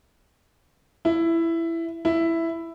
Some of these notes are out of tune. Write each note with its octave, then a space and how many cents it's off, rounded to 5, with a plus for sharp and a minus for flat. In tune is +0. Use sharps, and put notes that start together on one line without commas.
E4 +10
E4 +5